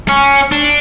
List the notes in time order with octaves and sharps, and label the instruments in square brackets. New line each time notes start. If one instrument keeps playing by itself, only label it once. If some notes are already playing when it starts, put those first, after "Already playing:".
[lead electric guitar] C#4
D4